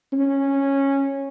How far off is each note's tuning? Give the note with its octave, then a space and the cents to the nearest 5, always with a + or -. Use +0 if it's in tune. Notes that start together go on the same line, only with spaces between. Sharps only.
C#4 -10